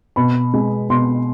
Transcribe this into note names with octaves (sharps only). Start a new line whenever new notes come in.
B2 B5
G#3
B2 C6